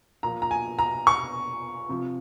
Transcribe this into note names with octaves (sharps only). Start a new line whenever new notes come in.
A#2 F3 A#5
A#5
G#5
A#5
C#6
C3 F3